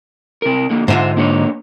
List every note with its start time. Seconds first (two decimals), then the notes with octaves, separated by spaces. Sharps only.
0.42 C3 A#4
0.70 D3 A#3
0.88 G#2 D3 F4 C5 E5
1.17 A#3 D4 C#5